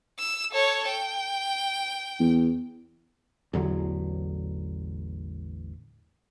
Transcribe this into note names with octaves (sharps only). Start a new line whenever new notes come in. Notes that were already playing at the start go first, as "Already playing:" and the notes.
E6
A4 C#5
G5
E2
A1 E2 D3 F#3